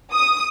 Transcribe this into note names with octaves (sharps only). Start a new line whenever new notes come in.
D#6